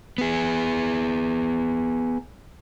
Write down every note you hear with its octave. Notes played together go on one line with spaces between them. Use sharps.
B3 G#4